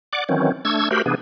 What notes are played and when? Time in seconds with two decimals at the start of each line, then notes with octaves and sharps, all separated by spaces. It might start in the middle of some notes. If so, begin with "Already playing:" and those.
0.13 D5 F#5 D6
0.29 D#3 E3 F#3 C4 C#4
0.65 A3 D4 C#6 E6 G#6
0.91 A3 F#4 G4 A#4 C5 B5
1.06 C3 E3 B3 D4 G#4